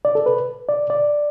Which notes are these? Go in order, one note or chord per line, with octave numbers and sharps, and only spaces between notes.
D5
A4
B4
D5
D5